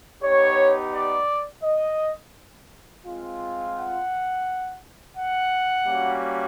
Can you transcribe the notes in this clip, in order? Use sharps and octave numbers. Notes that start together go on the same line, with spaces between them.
B3 D#4 G4 C#5
D5
D#5
G#3 C4 F4
F#5
F#5
G3 A#3 C#4 F#4